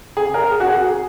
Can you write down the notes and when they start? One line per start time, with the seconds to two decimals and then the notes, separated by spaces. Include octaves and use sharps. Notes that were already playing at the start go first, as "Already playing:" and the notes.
0.17 G#4
0.34 A#4
0.52 G#4
0.60 F#4
0.67 G#4
0.85 G#4